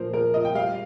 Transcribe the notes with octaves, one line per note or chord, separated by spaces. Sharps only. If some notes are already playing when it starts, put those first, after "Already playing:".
Already playing: A#2 F3 A#4 C5
F3 A#4
F4 D#5
G5
G3 F5